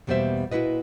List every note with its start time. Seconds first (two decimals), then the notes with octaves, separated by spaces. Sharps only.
0.07 E2 B2 G3 A#3 C5 E5
0.51 A#2 E4 F#4 B4 D#5